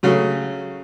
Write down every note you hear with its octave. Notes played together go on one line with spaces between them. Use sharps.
C#3 F#3 A3